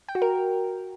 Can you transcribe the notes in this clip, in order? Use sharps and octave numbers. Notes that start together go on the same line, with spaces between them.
G5
F#4
A#4